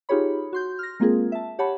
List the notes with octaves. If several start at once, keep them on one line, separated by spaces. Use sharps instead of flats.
D#4 F4 G4 G#4 C#5 B5
F#4 C6 G6
F6 A#6
G#3 A#3 C4 F4 G#4 A#4
E5 A5
G4 C#5 F#5 A5 B5